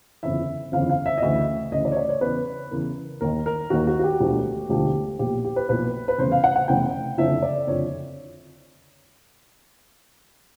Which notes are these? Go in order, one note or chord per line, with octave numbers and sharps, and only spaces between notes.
G1 F2 C#3 E3 E5
G1 F2 C#3 E3 F5
F5
E5
D#5
D2 C#3 E3 E5
D2 C#3 E3 D#5
D5
C#5
D5
C#5
E2 C#3 E3 B4
E2 C#3 E3 A#4
D#2 D#3 A#4
A#4
D#2 D#3 F#4
F#4
F#4
G4
E1 D2 D3 F3
E1 D2 D3 F3 G4
B1 A#2 F3 G4
G4
B4
B1 A#2 F3 B4
B4
F1 E2 C#3 E3 C5
F5
F#5
F#5
F1 E2 C#3 E3 G5
F#1 F2 D3 F3 E5
D5
F#1 F2 D3 F3 C#5